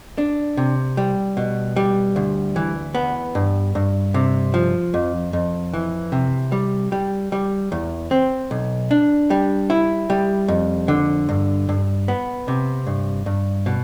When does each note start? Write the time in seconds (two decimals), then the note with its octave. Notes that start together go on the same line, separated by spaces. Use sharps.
0.18 D4
0.57 C3
0.97 G3
1.37 B2
1.76 G3
2.16 D2
2.56 E3
2.95 B3
3.35 G2
3.75 G2
4.14 C3
4.54 F3
4.94 F2
5.33 F2
5.73 E3
6.12 C3
6.52 G3
6.92 G3
7.32 G3
7.72 E2
8.11 C4
8.51 B1
8.91 D4
9.30 G3
9.70 E4
10.10 G3
10.48 F2
10.88 D3
11.29 G2
11.69 G2
12.08 B3
12.48 C3
12.86 G2
13.26 G2
13.66 B2